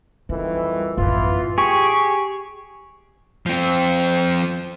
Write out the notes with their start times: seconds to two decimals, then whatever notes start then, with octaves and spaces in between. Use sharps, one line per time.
0.29 F2 D#3 E3 G3
0.98 A1 F#2 E3 B3 F4
1.58 G4 G#4 C#6
3.46 F3 C4